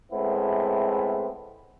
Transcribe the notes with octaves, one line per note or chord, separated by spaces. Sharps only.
A2 G#3 B3 C4 E4